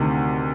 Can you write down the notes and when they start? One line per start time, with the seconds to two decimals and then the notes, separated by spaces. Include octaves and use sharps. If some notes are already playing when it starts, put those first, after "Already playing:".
Already playing: D2 C3 D#3